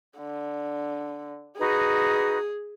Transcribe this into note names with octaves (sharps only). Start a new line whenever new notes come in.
D3
D#4 F#4 G#4 B4